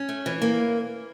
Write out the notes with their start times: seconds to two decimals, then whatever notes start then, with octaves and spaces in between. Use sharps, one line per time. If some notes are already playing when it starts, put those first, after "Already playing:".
Already playing: C#4
0.09 A3
0.26 E3
0.42 A#3